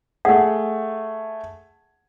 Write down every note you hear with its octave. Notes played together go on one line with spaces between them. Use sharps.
A3 G#4 F#5